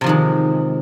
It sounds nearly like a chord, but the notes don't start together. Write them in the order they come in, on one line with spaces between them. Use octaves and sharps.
C3 F3 D#3 G#3